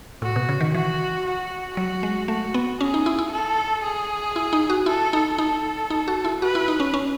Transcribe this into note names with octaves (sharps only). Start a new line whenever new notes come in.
A2 F#4
B2
C#3
D#3
E3 F#4
F#4
F#3 F#4
G#3
A3 F#4
B3
C#4 G#4
D#4
E4
E4
A4
G#4
E4
D#4
F#4
E4 A4
D#4
D#4 A4
D#4
F#4
E4
F#4 B4
E4
D#4
C#4
C#4